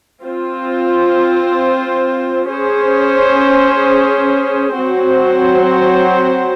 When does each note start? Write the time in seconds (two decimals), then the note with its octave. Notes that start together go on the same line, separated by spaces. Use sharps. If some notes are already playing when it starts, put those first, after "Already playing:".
0.22 C4 F4 C5
2.48 C#4 G#4 C5
4.75 F#3 C4 F#4 C5